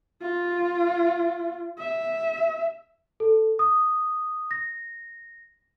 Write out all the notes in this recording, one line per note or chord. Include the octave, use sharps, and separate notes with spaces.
F4
E5
A4
D#6
A#6